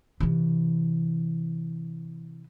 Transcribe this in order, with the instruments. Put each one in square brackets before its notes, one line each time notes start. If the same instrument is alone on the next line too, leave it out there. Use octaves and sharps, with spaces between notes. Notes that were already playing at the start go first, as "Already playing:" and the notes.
[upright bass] C3 E3